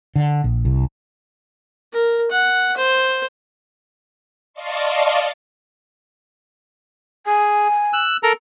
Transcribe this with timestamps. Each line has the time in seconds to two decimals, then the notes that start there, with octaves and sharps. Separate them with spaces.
0.16 D3
0.44 A#1
0.65 C2
1.93 A#4
2.31 F#5
2.77 C5
4.54 D5 D#5 F5 A5 C6 C#6
7.27 G#4 G#5
7.93 E6 F#6
8.23 A4 A#4 A#5